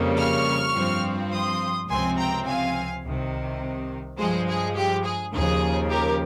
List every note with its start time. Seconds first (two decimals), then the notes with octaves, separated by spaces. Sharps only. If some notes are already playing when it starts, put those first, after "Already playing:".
Already playing: F2 C#3 G3 A#3
0.18 C#6 F6
0.75 G2 F3 C4
1.32 C6 D#6
1.89 C#2 C3 F3 C4 G#5 C6
2.18 G5 A#5
2.46 F5 G#5
3.04 C2 C3 D#3
4.18 G2 F3 G#3 G#4 C5
4.47 G#4
4.75 G4
5.04 G#4
5.32 D#2 C#3 F3 G#4
5.90 G4 A#4